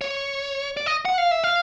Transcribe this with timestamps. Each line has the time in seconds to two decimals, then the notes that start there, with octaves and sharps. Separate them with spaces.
0.01 C#5
0.77 D5
0.86 D#5
1.05 F#5
1.18 F5
1.31 E5
1.44 F5